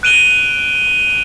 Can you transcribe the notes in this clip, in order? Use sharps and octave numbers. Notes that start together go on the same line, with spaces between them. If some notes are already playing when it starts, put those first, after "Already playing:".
F#6 D7 D#7 F7 G7